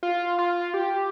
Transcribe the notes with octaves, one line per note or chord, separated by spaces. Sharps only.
F4
F4
G4